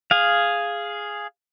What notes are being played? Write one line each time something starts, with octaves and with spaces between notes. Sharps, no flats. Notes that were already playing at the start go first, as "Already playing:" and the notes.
G#4 F5